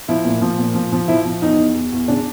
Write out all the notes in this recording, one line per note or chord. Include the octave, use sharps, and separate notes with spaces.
F3 E4
A#2
F3
A#2
F3
F3
F3 E4
F3
E2 D#4
E2
E2
E2
C#3 D4